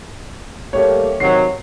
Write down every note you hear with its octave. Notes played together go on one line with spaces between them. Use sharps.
G3 A3 A#3 G4 C#5
C3 D#3 F#3 C7